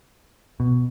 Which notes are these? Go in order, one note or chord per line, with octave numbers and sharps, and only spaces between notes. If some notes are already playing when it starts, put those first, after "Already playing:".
B2